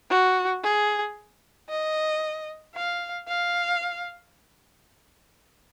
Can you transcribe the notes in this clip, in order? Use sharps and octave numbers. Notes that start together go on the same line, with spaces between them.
F#4
G#4
D#5
F5
F5